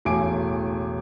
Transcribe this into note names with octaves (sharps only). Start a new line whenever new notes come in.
E1 A1 A3 G#5 D6 D7